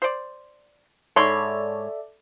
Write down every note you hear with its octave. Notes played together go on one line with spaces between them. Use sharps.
C5 D5
G#2 A4 C#5 D5 E5 B5 C6